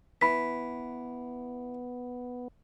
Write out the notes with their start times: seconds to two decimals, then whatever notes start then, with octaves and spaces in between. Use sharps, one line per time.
0.21 E3 B3 B5 B6